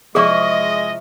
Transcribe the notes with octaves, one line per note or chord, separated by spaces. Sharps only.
C3 F3 G#3 E4 G#4 D5 D#5 C#6